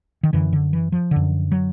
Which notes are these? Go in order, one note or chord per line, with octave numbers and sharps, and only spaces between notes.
D#3
F#2 D3 E3
D3
E3
F3
F#2 D3
F#3